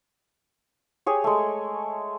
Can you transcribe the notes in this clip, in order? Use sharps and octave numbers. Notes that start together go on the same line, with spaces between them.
G4 G#4 C#5
G#3 A3